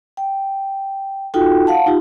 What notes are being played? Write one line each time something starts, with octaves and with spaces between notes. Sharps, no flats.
G5
D#4 F4 F#4 A4 G5
F5 F#5 A5
D#4 F4 G4